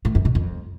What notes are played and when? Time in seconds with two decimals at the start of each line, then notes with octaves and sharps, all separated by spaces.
0.05 A2
0.15 F#2
0.25 B2
0.35 F2